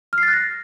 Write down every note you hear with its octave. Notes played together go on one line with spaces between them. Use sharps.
F6
C7
A6
F#6
A#6